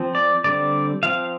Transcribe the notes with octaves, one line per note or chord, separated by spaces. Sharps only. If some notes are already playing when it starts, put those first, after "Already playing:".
Already playing: F3 C4
D5
D3 G3 C4 D5
F3 C4 F5